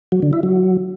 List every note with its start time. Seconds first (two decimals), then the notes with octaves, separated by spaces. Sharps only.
0.12 F#3
0.22 D3
0.33 E4
0.43 F#3